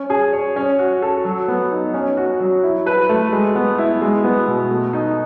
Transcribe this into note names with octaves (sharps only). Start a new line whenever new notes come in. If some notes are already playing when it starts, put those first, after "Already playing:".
Already playing: C#4
G#4
C#5
C#4
F#4
A4
F#3
B3
D#4
C#4
F#4
F#3
E4
B4
A3
G#3
B3
E4
G#3
B3
B2
A3
D#4